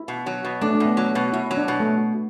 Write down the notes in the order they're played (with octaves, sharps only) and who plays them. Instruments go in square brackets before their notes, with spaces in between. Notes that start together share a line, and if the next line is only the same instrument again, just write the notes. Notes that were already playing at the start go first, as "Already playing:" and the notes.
Already playing: [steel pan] E4
[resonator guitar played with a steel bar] B2
F#3
B2
[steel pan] A3 [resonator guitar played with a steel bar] D4
[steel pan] A3
[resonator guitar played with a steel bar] B2
[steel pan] B3
[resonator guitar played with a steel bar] F#3
B2
[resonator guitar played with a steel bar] B2 [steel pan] E4
[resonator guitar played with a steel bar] F#3
[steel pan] D4
[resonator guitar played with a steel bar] B2
[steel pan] A3